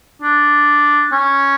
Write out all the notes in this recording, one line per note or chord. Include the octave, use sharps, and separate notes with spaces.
D4
C#4